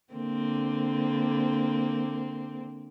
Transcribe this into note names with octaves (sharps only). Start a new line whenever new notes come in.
D3 A#3 C4